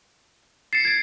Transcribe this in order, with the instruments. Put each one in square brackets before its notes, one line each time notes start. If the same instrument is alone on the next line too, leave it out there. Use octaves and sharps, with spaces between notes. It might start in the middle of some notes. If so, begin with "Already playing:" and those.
[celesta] A6 E7 [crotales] C7 C#7
[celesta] G#6 A6 D7